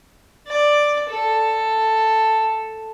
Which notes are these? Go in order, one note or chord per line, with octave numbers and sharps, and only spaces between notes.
D5
A4